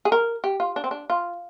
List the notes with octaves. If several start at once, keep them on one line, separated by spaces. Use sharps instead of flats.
G#4
A#4
G4
F4
D4
C4
D4
F4